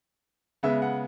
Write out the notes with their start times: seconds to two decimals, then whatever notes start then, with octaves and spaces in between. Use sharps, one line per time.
0.63 C#3 G#3 B3 E5
0.82 F#5